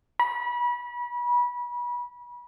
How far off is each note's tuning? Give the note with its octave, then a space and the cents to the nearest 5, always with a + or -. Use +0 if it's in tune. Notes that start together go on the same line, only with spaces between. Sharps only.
B5 -30